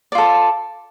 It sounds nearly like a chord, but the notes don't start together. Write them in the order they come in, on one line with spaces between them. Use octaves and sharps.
D5 F4 A4